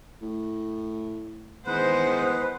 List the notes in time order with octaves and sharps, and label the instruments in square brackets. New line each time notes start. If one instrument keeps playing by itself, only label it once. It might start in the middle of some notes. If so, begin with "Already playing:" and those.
[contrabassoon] A2
[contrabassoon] E2 [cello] D#3 C5 [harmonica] G#3 F#5 [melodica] B4